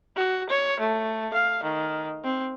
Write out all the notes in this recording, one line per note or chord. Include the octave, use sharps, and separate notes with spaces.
F#4
C#5
A3
F5
D#3
C4